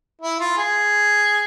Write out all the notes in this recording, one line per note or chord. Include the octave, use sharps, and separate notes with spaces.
E4
F4
G#4